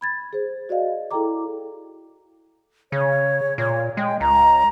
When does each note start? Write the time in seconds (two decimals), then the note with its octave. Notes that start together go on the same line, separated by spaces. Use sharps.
0.01 B5 G#6 A6
0.33 G#4 C5
0.69 F#4 D5 D#5 F5
1.11 E4 G#4 A4 G5 A#5 D6
2.92 C#3 C#5
3.58 A#2 C#5
3.97 G#3 G5
4.20 C#2 A#5